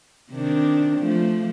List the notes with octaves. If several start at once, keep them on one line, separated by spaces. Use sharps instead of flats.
C3 D#3 D4
F3 A3